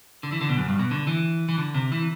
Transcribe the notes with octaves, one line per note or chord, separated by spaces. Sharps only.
D3
E3
D3
B2
F#2
G2
B2
D3
E3
E3
D3
C3
E3